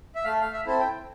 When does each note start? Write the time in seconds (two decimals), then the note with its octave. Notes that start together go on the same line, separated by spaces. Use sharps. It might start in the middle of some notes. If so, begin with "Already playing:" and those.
0.15 E5
0.24 A3 F5
0.41 F5
0.53 E5
0.66 C4 E4 A4
0.80 G5